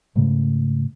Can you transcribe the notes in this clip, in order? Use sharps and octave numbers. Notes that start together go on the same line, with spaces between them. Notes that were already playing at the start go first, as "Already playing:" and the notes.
G#2 C#3 A3